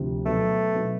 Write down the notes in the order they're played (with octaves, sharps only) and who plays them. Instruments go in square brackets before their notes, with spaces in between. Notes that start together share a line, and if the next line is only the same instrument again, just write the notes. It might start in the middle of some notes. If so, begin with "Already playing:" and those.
Already playing: [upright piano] D2 C3 F3
[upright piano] B2 F#3 B3 [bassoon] A3
[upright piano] B2 F#3 B3